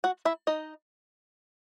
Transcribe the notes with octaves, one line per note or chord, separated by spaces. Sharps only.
F#4 F#5
E4 E5
D#4 D#5